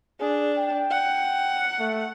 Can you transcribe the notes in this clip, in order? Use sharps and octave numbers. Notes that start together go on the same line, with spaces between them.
D4 G#4
G5
F#5
A3